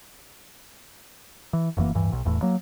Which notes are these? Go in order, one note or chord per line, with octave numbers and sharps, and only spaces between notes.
E3
F1 F#2 E3 A#3
D1 G2 E3
B1
E1 E2 A2
F#3 A#3